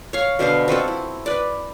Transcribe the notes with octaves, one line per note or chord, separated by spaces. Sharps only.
C#5 F5
B2 D3 C5 F5
C4 F4 F#4 A4
E4
B4 D5